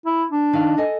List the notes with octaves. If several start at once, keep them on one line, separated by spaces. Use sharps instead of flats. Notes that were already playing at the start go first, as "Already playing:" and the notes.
E4
D4
D#3 F5
A4 D#5 G#5